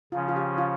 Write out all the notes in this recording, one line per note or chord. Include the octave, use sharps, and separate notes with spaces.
C#3 F3 C#4 F4
F4
G4
F4